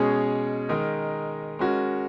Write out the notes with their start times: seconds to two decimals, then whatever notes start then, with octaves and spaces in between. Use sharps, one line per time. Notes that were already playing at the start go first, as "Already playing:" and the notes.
Already playing: B2 G#3 C#4 G#4
0.69 D#3 G#3 D#4 A#4
1.59 G#3 C#4 F#4 A#4